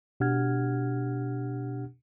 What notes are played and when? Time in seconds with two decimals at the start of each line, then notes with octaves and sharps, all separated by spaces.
0.20 B2 D4 G4 F#5 F6 G#6